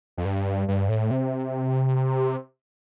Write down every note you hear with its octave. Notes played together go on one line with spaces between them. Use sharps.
F2
G2
G2
A2
C3